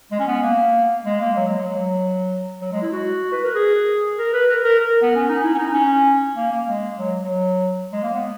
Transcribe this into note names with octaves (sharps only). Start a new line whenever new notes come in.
G#3
C#4
B3
A#3
G#3
A#3
F#3
G#3
F#3
F#3
F#3
G#3
E4
F#4
B4
A#4
G#4
A#4
B4
A#4
A#4
A#4
B3
C#4
D#4
E4
C#4
D#4
C#4
A#3
A#3
G#3
F#3
F#3
G#3
A#3
B3